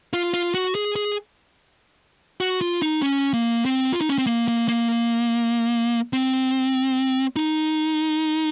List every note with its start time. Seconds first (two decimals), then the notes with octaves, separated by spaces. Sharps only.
0.13 F4
0.34 F4
0.54 F#4
0.75 G#4
0.96 G#4
2.41 F#4
2.61 F4
2.82 D#4
3.02 C#4
3.34 A#3
3.65 C4
3.93 F4
4.01 D#4
4.09 C#4
4.18 C4
4.27 A#3
4.48 A#3
4.68 A#3
6.13 C4
7.36 D#4